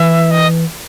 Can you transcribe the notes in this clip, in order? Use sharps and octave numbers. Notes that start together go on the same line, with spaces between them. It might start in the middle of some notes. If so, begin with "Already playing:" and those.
Already playing: E3 E5
D#5